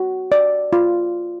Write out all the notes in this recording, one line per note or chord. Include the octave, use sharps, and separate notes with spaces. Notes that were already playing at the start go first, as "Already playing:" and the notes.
Already playing: F#4
D5
F4